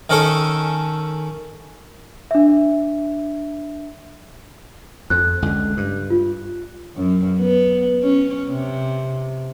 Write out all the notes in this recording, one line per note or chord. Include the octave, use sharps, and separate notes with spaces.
D#3 C#4 A4
D4 E5
F2 F#6
C#2 D3
G2
F4
F#2
B3
C#4
C3